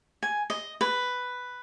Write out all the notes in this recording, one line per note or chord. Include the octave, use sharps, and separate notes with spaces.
G#5
D#5
B4